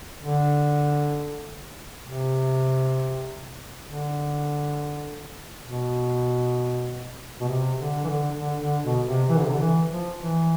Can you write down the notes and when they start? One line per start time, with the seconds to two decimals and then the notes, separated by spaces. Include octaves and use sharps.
0.23 D3
2.04 C3
3.85 D3
5.67 B2
7.41 B2
7.48 C3
7.78 D3
8.04 E3
8.08 D3
8.39 D3
8.61 D3
8.84 B2
9.07 C3
9.29 E3
9.36 D3
9.44 C3
9.52 D3
9.59 E3
9.89 F3
10.20 E3